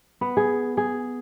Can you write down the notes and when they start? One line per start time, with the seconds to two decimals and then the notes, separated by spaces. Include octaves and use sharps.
0.21 B3
0.37 G#4
0.77 G#4